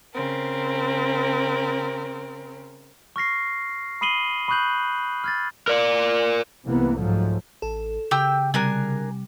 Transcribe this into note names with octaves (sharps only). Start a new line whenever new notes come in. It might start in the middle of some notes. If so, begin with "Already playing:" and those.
C#3 C4 A#4
C#6 F6 A#6 C7
B5 D#6 C7 D#7 F#7 G7
B5 C#6 D#6 F#6 G6 F#7
F6 G#6 A6
A#4 D5
C2 C3 E3 A#3 B3
G#2 F3 F#3 A3
A1 A4
C#3 G4 G5 E6
C3 G3 D4 A#4 G#5